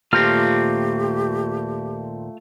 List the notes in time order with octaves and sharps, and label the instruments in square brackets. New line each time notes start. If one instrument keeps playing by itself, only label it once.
[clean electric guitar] D#2 A#2 C4 [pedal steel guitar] A3 F4 F6 [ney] G4